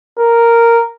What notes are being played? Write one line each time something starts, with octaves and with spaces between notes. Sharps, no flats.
A#4